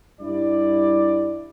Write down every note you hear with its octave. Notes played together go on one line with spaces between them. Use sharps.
G2 G3 E4 D5